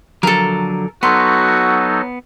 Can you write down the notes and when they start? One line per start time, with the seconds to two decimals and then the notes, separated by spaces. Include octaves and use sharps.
0.23 D3 F3 F#3 A4 A#4
1.03 F#3 B3 D#4 F#4 A4 C6